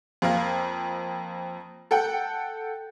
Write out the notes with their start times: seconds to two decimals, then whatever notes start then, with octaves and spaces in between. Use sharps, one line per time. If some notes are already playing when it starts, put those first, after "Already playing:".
0.22 F2 A#3 F5
1.91 A4 F#5 G5